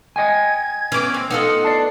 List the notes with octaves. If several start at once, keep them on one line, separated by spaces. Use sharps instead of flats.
D#5 G5 G#5 G#6
E3 B3 C#4 D6
C4
B3 D#4 F4 A4 F#5
D5 A5 C7